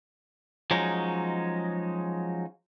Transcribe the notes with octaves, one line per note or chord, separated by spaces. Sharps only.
F3 F#3 G#3 C#4 D#4